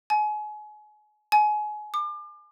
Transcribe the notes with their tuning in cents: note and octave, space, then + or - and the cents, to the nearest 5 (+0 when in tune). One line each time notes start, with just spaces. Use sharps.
G#5 +30
G#5 +25
D6 +35